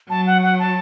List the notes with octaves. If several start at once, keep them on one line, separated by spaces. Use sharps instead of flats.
F#3 A5
F#5
F#5
A5